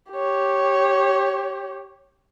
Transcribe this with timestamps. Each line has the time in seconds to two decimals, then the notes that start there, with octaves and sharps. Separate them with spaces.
0.12 G4 C#5